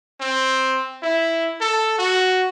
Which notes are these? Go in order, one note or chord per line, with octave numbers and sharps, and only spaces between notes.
C4
E4
A4
F#4